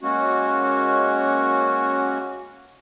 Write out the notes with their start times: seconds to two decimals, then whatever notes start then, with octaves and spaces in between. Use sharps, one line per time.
0.01 G#3 A#3 C#4 F#4